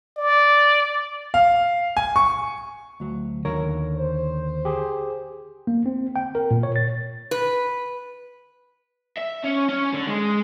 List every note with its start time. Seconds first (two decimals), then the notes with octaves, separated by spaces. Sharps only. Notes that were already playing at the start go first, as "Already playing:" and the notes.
0.17 D5
1.34 F5
1.97 G#5
2.16 C#6
3.00 D2 F#3
3.45 D#2 D3 A#4 C#5
3.97 C5
4.65 G4 G#4
5.67 A#3
5.86 C4
6.16 G5
6.35 A#4
6.51 A#2
6.63 C#5
6.76 A6
7.31 B4
9.18 E5
9.44 C#4
9.69 C#4
9.94 D3
10.08 G#3